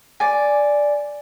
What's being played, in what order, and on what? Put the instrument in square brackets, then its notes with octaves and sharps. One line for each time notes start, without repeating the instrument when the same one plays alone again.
[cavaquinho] D5 G#5